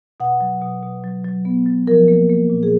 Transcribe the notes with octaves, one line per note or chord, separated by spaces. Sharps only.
B2 F#5
F#3
B2
B2
F#3
F#3
B3
F#3
F3 A#4
A#3
A#3
A#2
G#4